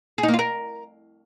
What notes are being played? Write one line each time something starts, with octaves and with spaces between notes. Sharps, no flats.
G#4
D#4
A#3
F4
A#4